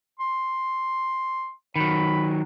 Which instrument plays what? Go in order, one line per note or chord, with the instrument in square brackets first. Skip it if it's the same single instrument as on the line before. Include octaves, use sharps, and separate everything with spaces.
[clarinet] C6
[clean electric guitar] D#3 F#3 [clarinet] B5